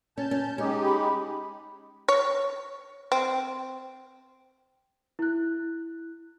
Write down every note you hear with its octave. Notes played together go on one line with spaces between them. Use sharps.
C#4 A5 G6
C#4
G#3 C#4 D#4 G4
B5
C#5
C4
E4 F#6